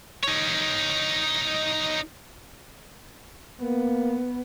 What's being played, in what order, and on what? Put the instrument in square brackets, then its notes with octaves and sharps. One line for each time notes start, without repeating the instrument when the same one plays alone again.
[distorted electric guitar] D#4 C#5
[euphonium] A#3 [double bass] B3